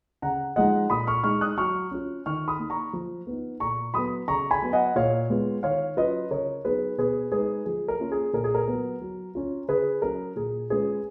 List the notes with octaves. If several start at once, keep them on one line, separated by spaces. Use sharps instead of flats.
C#3 F#5 A#5
F3 G#3 D#4 D#5 F#5
A#2 B5 D#6
C#6 F6
G#3 D#4 C#6 F6
D#6 F#6
F#3 C#6 F6
C#4 F4
D#3 C#6 F6
B5 D#6
A#3 D#4
A#5 C#6
F3
B3 D#4
A#2 A#5 C#6
F#3 B3 B5 D#6
C#3 A#5 C#6
G#5 B5
F#3 B3
D#5 F#5
A#2 C#5 F5
G#3 B3 F4
D#3 C#5 F5
F#3 C#4 F4 B4 D#5
C#3 A#4 C#5
F#3 B3 D#4 G#4 B4
B2 G#4 B4
G#3 D#4 G#4 B4
F3 G#4
A#4
A#3 C#4 F4
G#4
A#2 A#4
G#4
A#4
F#3 B3
F#3
C#4 F4
C#3 G#4 B4
F#3 C#4 A#4
A#2 G#4
G#3 C#4 F4 G#4 B4